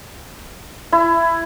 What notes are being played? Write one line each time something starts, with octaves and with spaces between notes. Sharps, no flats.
E4